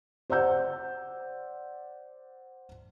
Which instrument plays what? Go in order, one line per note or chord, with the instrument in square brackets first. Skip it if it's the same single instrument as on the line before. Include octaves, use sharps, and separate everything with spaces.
[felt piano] C5 D5 F#5 E6 G6